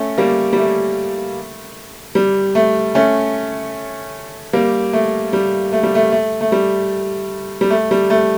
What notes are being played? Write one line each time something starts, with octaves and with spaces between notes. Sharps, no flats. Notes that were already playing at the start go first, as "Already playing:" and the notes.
Already playing: A3 C#4
G3 A#3
G3
A3
G3
A3
A3 C#4
G3 A#3
A3
G3
A3
G3
A3
A3
A3
G3
G3
A3
G3
A3